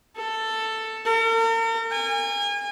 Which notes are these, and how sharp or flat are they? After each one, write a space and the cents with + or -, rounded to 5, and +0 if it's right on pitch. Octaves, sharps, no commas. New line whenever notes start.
A4 +10
A#4 -45
G#5 -35